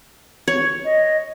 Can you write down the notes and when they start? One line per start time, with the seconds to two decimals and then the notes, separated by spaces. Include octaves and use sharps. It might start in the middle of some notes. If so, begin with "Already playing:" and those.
0.48 C#5
0.84 D#5